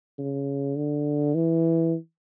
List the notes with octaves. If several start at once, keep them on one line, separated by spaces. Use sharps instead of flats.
C#3
D3
E3